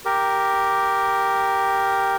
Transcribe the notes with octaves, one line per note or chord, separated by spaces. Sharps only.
G4 A#4